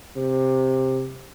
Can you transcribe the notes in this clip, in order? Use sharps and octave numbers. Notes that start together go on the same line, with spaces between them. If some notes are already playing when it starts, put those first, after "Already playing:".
C3